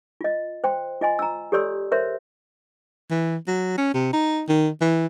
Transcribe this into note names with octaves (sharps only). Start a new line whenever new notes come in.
F4 D#5
C5 G5 C6
F4 D#5 G#5 C6
A#5 E6
G4 A4 C#5 D5 C6 E6
A#4 C5 C#5 E5 C6
E3
F#3
C#4
C3
D#4
D#3
E3